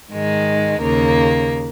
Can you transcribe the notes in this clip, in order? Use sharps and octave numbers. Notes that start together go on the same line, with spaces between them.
G#2 D#3 G#3
D#2 C#3 A#3